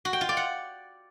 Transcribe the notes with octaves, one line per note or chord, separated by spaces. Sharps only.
F#4
G5
F4
D5
F#5